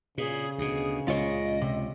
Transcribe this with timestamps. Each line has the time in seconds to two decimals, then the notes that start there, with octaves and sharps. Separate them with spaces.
0.18 A#2 C#3 G#4
0.58 D2 B2 G#4
1.08 C#2 A#2 F4 C#5 D#5
1.62 C3